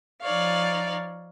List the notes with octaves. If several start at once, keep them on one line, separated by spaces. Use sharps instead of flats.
F3 D#4 C#5 D5 F5